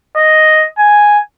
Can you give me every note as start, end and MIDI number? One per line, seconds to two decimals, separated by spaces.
0.16 0.66 75
0.78 1.18 80